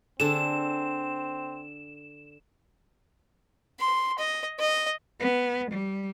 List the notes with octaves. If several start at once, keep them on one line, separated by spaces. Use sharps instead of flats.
D3 C4 G#4 A4 E7
C6
D#5
D#5
B3
G3